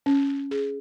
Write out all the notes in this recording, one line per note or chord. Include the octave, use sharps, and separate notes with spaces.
C#4
G#4